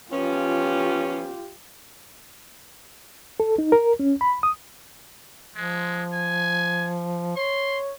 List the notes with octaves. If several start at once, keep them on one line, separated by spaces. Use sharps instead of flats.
F3 B3 C#4 F4 G4
A4
D#4
A#4
C#4
B5
D#6
F3 G#3
G#5
C#5 C6